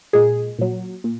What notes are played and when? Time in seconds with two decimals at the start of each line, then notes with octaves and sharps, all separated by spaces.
0.13 A#2 G#3 G#4
0.59 A#2 F#3
1.04 A#2